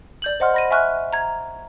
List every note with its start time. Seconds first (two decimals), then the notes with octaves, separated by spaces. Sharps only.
0.22 D5 G6 F#7
0.40 C5 D#5 F#5 C6 F6
0.54 B5 A#6 D#7
0.71 E5 G#5 C#6 F6 F#6
1.13 A#5 G#6